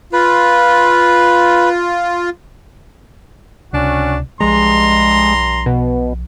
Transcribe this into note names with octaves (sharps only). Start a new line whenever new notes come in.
F4 B4
C#2 C3 C#4 D4 F#4
B1 G2 F3 G#3 A#5 C6
B2